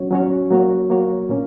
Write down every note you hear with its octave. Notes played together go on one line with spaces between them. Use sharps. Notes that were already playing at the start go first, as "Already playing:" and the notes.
Already playing: F#3 C#4 F#4 C#5
F#3 C#4 F#4 C#5
F#3 A#3 F#4 C#5
F#3 A#3 F#4 C#5
A#2 A#3 C#4